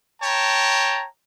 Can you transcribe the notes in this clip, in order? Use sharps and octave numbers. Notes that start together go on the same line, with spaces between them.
C#5 G5 A5 A#5